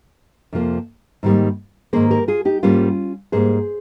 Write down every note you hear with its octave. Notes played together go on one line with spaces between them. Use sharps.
F2 C3 F3 A#3
G#2 D#3 G3 A#3
G#2 D#3 A#3 G#4 C5
G4 A#4
F4 G#4
D#4 G4
G#2 G3 A#3 C#4 F4
G#2 G3 A#3 G#4 C5